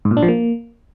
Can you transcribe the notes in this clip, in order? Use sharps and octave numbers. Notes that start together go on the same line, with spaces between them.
G#2
A#2
D4
F3
A#3